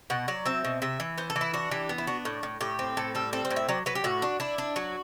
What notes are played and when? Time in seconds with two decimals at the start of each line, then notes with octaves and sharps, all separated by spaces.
0.10 B2 F#5
0.28 F#3 D5
0.45 C4 E5
0.64 B2
0.82 C3 E5
1.00 E3
1.18 B3 C5
1.30 A4
1.36 E3
1.41 E4
1.54 D4 F#4
1.71 E3 G4
1.89 B3
1.98 E4
2.07 D4 F#4
2.25 A2
2.43 A2
2.61 A2 G4
2.79 C4
2.97 A2 A4
3.15 G3 A4
3.33 C4 A4
3.45 C5
3.50 A2
3.56 E5
3.69 F#3 D5
3.86 F#3 B4
3.95 G4
4.04 A2 F#4
4.22 D4
4.40 D4 E4
4.58 D4
4.76 F#3 F#4